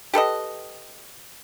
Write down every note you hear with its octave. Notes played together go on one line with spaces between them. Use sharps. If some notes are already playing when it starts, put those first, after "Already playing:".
G4 A4 B4 D#5